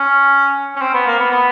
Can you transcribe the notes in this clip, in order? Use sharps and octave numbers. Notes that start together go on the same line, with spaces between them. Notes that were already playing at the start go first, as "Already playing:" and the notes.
Already playing: C#4
C#4
C4
B3
A#3
B3
B3